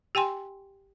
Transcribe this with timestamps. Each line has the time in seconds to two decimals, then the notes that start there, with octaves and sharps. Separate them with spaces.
0.15 G4 G5 G#5 C6